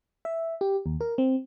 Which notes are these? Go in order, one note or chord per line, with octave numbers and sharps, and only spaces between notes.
E5
G4
D#2
A#4
C4